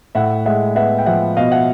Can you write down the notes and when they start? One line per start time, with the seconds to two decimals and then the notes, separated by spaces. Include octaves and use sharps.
0.15 A2 E5 F#5
0.46 G#3 E5 F#5
0.75 B3 E5 F#5
0.98 G5
1.06 F3 E5 F#5
1.37 B2 D#5 F5
1.52 E5 F#5